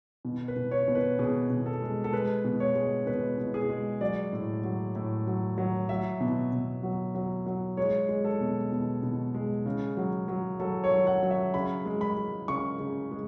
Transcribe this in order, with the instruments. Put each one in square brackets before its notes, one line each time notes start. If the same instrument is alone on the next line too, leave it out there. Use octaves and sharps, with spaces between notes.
[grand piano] B2
B4
B2
C#5
B2
B4
B2 G#4
B2
A4
G#3
A4
G#3 B4
B2
C#5
G#3
B2 B4
B2
G#4
G#3
F#3 D5
A2
F#3
A2
F#3
F#3
F#3 E5
B2
B2
F#3
F#3
F#3
G#3 C#5
G#3
A4
B2
B2
B2
G#3
C#3
F#3
F#3
F#3 A4
C#5
F#3
F#5
F#3
E5
C#3 B5
G#3
B5
G#3
C#3 C#6
C#3
G#3